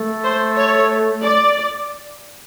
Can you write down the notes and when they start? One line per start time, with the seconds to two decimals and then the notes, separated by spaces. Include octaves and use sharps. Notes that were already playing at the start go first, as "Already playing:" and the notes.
Already playing: A3
0.24 C5
0.57 C#5
1.23 D5